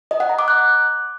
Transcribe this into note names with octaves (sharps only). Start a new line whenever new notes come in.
D#5
F#5
A#5
D6
F#6